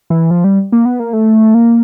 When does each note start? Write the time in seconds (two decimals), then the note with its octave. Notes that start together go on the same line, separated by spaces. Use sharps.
0.10 E3
0.31 F3
0.44 G3
0.72 A#3
0.85 B3
1.00 A#3
1.13 A3
1.54 A#3